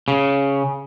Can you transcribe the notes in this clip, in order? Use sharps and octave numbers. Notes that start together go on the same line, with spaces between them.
C#3